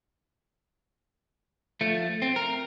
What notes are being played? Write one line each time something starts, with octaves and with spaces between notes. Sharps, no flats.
F3 A3
C4
A#4